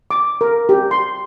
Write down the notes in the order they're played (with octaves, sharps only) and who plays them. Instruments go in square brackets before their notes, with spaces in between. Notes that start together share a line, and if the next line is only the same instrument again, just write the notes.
[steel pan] D6
A#4
G4
C6